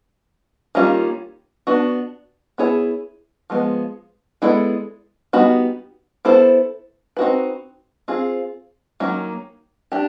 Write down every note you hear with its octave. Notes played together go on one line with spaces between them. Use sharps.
D#3 G3 A#3 C#4 F4
B3 D4 F#4
B3 E4 G#4 C#5
F3 G#3 B3
G#3 B3 E4 A4 D5
G3 B3 D#4 F#4
B3 E4 A4 C5
C4 D#4 F#4 B4
C4 F4 G#4
D#3 F#3 A#3 C#4
D4 G4